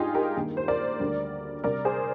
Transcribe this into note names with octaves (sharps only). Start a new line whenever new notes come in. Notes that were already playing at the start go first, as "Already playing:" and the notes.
Already playing: G#2 G#3 D4 D#4 F4 G4 G#4
G4 A#4
G2 D#3 A#3
C5
A#4 D5
D2 D3 G3
C3 G3 D4 A#4 D5
G#4 C5